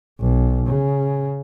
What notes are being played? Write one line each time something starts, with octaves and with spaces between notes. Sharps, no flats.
B1
C#3